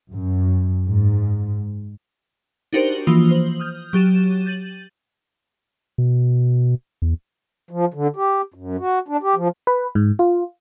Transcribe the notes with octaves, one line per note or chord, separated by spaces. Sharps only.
F#2
G#2
D4 D#4 F#4 G4 A#4 C5
E3 F3 A#3 F4 D#6 G7
C5 F#7
D#6 F6 G6
F#3 G4 A6 D#7 E7
G6 A6 D#7 F#7
B2
E2
F3
D3
G4
F#2
F#4
D4
G4
F3
B4
G#2
F4